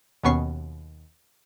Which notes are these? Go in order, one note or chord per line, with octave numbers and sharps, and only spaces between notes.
D#2 B2 B3 C#4 C#6 C7